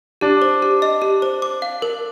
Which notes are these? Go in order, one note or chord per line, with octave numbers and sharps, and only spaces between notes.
D4 G4
C5
G4
D#5
G4
C5
D6
F5
A#4